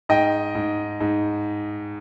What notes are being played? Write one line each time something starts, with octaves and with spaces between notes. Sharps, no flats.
G#2 D#5 G5
G#2
G#2